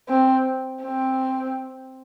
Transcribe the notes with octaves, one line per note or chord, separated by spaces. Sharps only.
C4
C4